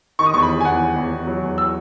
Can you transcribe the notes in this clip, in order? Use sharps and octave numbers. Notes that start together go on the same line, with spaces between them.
D#3 C#6
D#6
E2 C#6
B5
E2
G#5
E2 F#5
E2
E2
E2
F#3
E2
E6